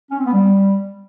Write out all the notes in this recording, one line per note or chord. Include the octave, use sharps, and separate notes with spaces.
C#4
C4
B3
G3